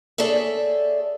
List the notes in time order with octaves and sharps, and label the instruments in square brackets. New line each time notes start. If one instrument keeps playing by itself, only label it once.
[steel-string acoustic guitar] G#4 A4 C#5 D5 E5